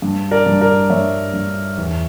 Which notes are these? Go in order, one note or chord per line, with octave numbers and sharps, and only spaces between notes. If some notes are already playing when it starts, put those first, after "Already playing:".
G2
A#4 D5
G2
A#4 D5
G2 C#5 E5
G2
E2